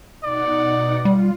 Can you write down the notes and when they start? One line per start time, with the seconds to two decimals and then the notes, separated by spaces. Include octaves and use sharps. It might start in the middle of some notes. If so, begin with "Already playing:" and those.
0.23 B2 D#4 D5 F#5
1.05 G3 F4